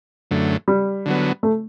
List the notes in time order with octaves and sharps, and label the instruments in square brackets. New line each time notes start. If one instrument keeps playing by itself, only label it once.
[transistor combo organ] F#2 D3 A3
[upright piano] G3
[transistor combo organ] D3 F#3 B3
[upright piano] A3